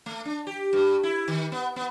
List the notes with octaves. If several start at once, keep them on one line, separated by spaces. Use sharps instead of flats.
A3
D4
G4
G2
E4
D#3
B3
B3